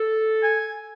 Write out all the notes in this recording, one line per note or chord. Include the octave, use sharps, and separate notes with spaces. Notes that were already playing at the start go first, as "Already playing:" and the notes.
Already playing: A4
G#5